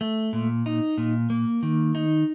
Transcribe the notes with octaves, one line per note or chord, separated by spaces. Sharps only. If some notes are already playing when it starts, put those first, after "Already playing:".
A3
A#2
D#4
A#2
A#3
D#3
D#4